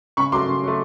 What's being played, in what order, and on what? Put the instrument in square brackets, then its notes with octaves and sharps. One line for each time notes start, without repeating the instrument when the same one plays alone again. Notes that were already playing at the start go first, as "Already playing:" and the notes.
[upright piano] C#3 B5 C#6
F#3 A3 C6 D6
C#3
F#3 A3